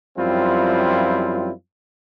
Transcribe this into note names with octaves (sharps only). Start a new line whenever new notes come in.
F#2 F3 G3 C4 E4 F4